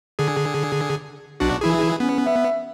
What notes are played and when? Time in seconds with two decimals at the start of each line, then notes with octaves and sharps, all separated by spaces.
0.19 D3 G#4
1.40 B1 D4 F#4
1.61 E3 E4 G#4
2.00 B3 C#4
2.26 E5